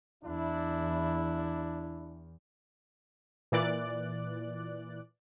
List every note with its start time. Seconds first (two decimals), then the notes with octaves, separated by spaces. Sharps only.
0.24 E2 D4 E4
3.52 A#2 E3 D5 F#6